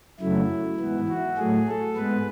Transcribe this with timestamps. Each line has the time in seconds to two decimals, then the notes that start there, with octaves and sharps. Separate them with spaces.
0.20 F#2 C#3 F#3 A3 E4
0.79 G#2 E3 B3
1.08 F#4
1.37 A2 F#3 A3 G#4
1.67 A4
1.96 G#2 G#3 B3 B4